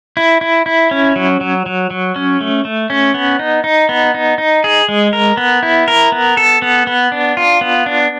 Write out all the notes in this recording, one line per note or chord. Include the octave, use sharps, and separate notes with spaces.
E4
E4
E4
C#4
F#3
F#3
F#3
F#3
C#4
A3
A3
C#4
B3
D#4
D#4
B3
D#4
D#4
G#4
G#3
A#4
B3
E4
A#4
B3
A4
B3
B3
D4
F4
B3
D4